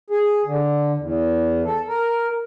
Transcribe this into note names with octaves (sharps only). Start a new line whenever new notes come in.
G#4
D3
E2
A4
A#4